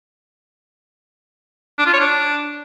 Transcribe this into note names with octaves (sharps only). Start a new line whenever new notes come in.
D4
F4
C#5
D4